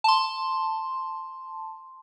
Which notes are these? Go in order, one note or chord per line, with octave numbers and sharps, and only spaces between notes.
A5 C6